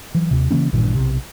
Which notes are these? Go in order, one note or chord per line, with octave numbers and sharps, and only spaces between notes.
E3 F#3
D#2 C3
C#3 E3 A#3 C#4
A1 G2 A#2 D#3
B1 C3